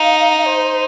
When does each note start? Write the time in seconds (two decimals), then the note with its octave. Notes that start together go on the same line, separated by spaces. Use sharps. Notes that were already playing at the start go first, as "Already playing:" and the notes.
Already playing: D#4 F5
0.46 C5